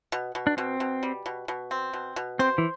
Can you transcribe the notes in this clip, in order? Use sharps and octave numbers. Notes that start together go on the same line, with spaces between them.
B2
B2
D4
B2 C4
B2
G3
B2
B2
C4
B2
B2
C4 C5
E3